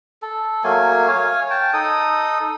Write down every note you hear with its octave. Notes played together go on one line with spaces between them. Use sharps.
A4
F#3 A3 A#3 G#5
C#5 F5 G#5
G5 A5
D#4 A4 D#6